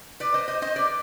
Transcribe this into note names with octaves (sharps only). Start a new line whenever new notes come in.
B4 D5
C5 D#5
C5 D#5
C5 D#5
B4 D5